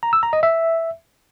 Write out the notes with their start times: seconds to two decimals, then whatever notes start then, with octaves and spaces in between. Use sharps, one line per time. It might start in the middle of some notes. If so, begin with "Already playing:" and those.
0.03 A#5
0.13 E6
0.23 A#5
0.33 D#5
0.43 E5